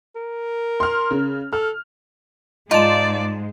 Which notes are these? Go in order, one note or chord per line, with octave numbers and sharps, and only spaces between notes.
A#4
C6 F6
C#3
A4 F6
G#2 G#3 D#4 F4 D5 A5